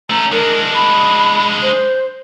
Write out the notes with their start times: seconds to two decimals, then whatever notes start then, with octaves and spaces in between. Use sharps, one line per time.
0.10 A3 C#4 A#5
0.32 G#3 D4 A#4
0.74 B5
1.62 C5